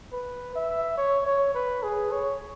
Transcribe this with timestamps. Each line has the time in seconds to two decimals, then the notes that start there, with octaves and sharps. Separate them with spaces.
0.12 B4
0.55 E5
0.97 C#5
1.26 C#5
1.54 B4
1.83 G#4
2.12 C#5